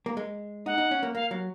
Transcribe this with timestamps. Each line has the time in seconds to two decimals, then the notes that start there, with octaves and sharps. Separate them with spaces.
0.06 A#3
0.17 G#3
0.66 D#4 F#5
0.78 D#4
0.91 C#4
1.03 A#3
1.15 A#3 F5
1.31 F#3